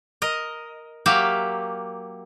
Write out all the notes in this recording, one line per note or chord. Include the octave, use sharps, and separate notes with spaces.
A#4 D#5
F#3 A#3 G4 E5 F5